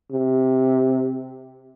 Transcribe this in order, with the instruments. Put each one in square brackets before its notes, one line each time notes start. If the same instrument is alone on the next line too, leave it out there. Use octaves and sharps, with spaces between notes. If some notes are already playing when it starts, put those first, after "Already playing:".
[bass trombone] C3